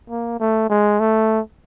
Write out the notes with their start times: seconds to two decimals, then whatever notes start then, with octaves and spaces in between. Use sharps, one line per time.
0.10 A#3
0.40 A3
0.70 G#3
1.00 A3